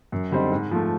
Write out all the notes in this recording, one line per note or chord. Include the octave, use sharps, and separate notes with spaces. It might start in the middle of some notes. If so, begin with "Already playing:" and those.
F#2
D3 G3 C4 D#4
G#2
F3 A3